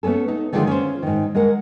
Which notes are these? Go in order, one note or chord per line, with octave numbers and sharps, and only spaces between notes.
A3 B3 C#4 G#4 A4
D#4
D3 D#3 F3 G#3 D4 F4
C#4 F4 C5
G#2 D#3
G#3 A#4 F#5